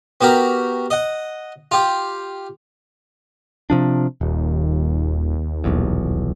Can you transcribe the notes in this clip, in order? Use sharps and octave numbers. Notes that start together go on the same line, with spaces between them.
B3 F#4 G4 A#4
D#5 F#5
F4 G4
C3 F3 D4
D#1 D#2
D#1 B1 E2